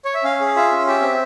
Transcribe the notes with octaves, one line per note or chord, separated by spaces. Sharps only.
C#5
E5
C#4 F5
G#4
F4 E5
C#4
G4 E5
C4